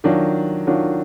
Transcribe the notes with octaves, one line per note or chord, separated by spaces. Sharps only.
D#3 F#3 D4 F4
D#3 F#3 D4 F4